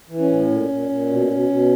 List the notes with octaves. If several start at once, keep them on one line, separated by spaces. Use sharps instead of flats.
E3
C#4
A2
A#2
A#2
A#2
B2
B2
B2